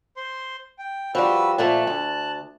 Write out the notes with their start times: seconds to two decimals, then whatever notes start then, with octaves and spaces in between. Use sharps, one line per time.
0.17 C5 C6
0.78 G5
1.15 F3 G3 F#4 B4 E6
1.58 A#2 F3 A3 A5 F#6
1.87 D2